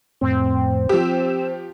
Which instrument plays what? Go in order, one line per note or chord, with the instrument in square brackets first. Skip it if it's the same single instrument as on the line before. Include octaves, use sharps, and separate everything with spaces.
[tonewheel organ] F2 A2 [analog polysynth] C4
[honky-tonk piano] F3 G4 [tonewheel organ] E6